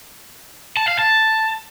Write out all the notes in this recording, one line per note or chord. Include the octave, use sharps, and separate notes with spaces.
A5
F5
A5